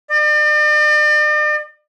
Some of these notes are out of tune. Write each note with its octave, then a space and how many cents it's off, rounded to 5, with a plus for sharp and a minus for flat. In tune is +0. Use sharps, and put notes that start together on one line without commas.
D5 +40